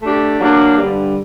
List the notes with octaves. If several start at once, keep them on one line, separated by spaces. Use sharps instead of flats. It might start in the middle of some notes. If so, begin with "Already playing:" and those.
A3 D4 G4
F#3 A#3 D4
G2 D3 G3